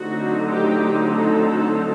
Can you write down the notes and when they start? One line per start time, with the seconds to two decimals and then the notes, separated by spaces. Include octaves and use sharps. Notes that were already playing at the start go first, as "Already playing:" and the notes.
Already playing: D3 F#3 A3 C4 D#4 F#4
0.49 G4
1.08 A4